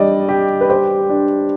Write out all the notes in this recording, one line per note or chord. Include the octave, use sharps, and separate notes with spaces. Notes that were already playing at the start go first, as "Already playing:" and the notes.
Already playing: G3 D4 D5 D#5
G4
B4
G4 C5
D4